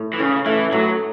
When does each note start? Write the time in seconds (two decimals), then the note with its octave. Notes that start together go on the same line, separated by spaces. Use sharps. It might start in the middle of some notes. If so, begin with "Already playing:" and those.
Already playing: A2
0.13 E3
0.19 C#3 C#4
0.46 E3 A3
0.72 A2 F#3